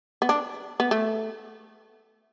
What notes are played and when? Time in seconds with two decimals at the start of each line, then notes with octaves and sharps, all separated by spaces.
0.22 B3
0.29 D4
0.80 B3
0.91 A3